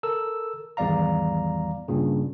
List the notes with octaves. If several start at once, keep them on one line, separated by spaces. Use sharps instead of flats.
A4 A#4 E6
G#1 E2 G3 D5 F5 A#5
G2 A#2 C#3